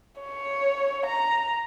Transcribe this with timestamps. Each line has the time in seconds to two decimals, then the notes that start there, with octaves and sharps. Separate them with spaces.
0.21 C#5
1.06 A#5